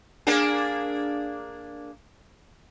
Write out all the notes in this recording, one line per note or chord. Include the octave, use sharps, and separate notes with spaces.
A#3 D4 G#4